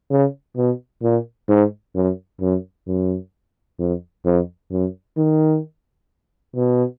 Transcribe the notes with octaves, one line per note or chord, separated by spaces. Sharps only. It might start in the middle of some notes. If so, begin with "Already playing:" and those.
C#3
B2
A#2
G#2
F#2
F#2
F#2
F2
F2
F#2
D#3
B2